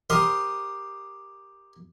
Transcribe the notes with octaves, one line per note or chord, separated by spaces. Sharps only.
G4 A#4 C5 D#5